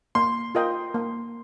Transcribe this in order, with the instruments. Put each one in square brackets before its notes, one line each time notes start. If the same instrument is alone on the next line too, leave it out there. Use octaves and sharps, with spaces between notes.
[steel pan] A#3 [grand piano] C6
[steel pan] F4 A#4 D#5 G5
A#3